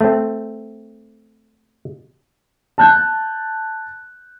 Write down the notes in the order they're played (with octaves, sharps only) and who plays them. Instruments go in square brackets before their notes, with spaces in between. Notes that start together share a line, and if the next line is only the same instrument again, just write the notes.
[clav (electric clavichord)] A3 C4
[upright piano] A5 F#6 G6